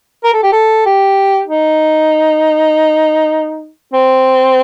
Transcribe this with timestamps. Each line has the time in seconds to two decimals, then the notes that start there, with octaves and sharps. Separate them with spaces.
0.24 A#4
0.33 A4
0.43 G4
0.52 A4
0.86 G4
1.47 D#4
3.93 C4